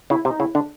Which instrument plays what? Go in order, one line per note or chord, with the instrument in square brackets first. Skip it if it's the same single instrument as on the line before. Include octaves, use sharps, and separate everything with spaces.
[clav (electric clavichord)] C#3 [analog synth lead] E4
[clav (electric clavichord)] C3
[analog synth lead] D#4
[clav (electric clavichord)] C#3 [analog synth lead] E4
[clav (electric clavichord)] D3 [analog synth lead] D4